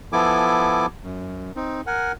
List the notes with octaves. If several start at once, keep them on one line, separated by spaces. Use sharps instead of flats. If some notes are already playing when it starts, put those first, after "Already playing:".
F3 B3 E4 A4 G#5 D6
F#2
C4 D#4
A#4 F#5 G#5